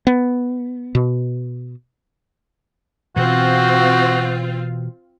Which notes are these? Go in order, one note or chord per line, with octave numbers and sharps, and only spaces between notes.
B3
B2
B2 E3 C4 F4 F#4 F5